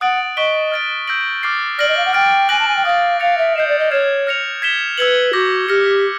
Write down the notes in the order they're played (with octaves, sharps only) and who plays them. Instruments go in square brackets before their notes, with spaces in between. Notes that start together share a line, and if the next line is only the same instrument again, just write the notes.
[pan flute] F#5 [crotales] D#6 F#6 A6 D7 F#7
[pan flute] D#5 [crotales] C#6 F#6 B6 D7 G7
[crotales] F6 A6 D7
E6 G6 A#6 D7 F#7
D6 F6 A6 C7
[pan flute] D5 [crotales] F6 A#6 D7 F#7
[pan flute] D#5
F5
F#5
[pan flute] G5 [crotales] F6 A6 D7
[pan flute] G#5 [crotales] F#6 A#6 D7 F#7
[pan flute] A5
G#5
G5
[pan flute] F5 [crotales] D#6 F#6 A6
[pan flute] F5 [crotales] A6 C#7 F7
[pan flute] E5
[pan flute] D#5 [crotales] G6 C7 E7
[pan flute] D5
D#5
[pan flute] C#5 [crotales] F6 G#6 C7 E7
[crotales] F6 A#6 C#7 F7
G#6 B6 E7 G7
[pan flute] B4 [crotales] E6 G#6 C#7 F#7
[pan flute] F#4 [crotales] D6 G6 A#6
[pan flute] G4 [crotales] F6 A#6 C#7